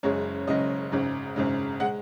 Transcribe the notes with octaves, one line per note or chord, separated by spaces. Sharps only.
F#1 F#2 C#3 G#3 C#5
F#1 F#2 C#3 G#3 D#5
G#1 F#2 C#3 G#3
G#1 F#2 C#3 G#3
G#3 F#5